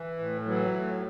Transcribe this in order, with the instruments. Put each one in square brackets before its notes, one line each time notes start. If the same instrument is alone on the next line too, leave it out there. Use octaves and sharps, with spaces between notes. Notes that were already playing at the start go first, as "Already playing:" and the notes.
Already playing: [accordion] E3
A2
E3 F#3
A2